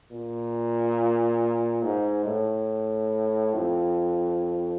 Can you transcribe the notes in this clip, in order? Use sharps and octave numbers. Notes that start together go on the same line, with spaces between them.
A#2
G#2
A2
F2